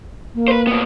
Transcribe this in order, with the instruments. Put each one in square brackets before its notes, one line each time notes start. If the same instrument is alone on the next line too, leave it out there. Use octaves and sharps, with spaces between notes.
[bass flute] A#3
[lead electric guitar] B4 C5
A2 B3